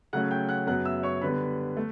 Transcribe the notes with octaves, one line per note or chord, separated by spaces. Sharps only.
C#3 F#3 A3 C#4 F#5 F#6
G5 G6
F#5 F#6
F#2 C#3 F#3 B3 F#5 F#6
E5 E6
C#5 C#6
D3 G3 B3 B4 B5
A3